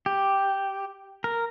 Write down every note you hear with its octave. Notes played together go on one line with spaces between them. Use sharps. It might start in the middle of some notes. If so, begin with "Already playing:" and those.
G4
A#4